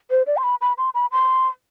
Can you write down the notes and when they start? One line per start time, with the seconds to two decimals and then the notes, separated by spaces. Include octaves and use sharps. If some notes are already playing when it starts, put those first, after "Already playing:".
0.11 C5
0.27 D5
0.37 C6
0.43 B5
0.61 B5
0.78 C6
0.94 B5
1.12 C6